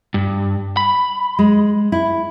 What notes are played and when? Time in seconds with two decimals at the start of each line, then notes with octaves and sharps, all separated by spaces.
0.14 G2
0.77 B5
1.39 G#3
1.92 E4